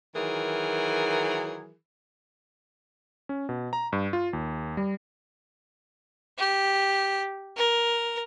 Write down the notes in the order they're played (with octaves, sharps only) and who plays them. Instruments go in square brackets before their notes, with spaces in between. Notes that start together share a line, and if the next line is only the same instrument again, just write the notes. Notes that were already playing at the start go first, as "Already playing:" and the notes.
[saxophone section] D#3 E3 F#3 G#4 A#4
[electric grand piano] C#4
B2
A#5
G2
F4
D#2
G3
[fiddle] G4
A#4